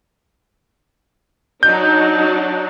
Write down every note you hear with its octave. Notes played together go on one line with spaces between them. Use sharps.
F#3 D4 D#4 G6